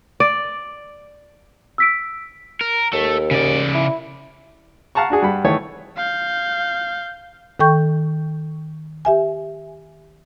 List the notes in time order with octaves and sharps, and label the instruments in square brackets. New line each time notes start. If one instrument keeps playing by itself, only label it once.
[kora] D5
[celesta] E6 B6 D7
[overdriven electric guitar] A#4
[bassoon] D#2 [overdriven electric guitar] A3
[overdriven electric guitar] C#3 D5
[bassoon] E4
[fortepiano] F5 F#5 A5 A#5 C#6
D4 F#4 G#4
G2 F#5 B5
D#3 E3 A3 C#5
[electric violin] F5 G6
[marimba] D#3 A4 G5 C#6 G6
G4 E5 G#5